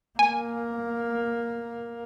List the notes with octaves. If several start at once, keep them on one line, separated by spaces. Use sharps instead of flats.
A#3 G#5